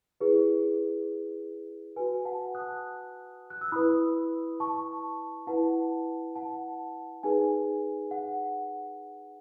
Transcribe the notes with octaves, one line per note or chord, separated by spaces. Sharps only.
E4 G#4 B4
F#4 B4 G#5
F#5 A5
D#6 F#6
F#6
E6
E4 B4 B5 D#6
A5 C#6
E4 B4 F#5 A5
F#5 A5
D#4 G#4 B4 G#5
F#5